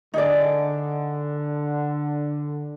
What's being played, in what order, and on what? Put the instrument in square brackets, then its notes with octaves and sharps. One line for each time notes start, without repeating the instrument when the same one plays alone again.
[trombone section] D3 [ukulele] D#4 G#4 D5